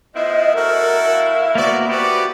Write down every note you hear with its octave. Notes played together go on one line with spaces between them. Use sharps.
A2 B3 E4 F4 C5 D#5
F#4 A4 A#4
F5
A#3 B3 F#4 C5 D5
B3 F#4 G4 B4 D5